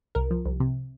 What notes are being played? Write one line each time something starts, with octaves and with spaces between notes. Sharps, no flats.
C2 A#4
F3
C2
C3